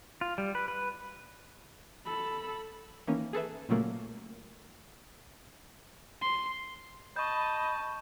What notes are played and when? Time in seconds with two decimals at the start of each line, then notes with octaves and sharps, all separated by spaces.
0.21 F4
0.38 G3
0.55 B4
0.68 B4
2.05 A4 B5
3.07 D#3 E3 A#3 C#4
3.33 G#4 A4 B4 E5
3.69 A#2 C#3 F#3 A3 A#3
6.22 C6
7.16 D#5 A5 B5 C#6 G6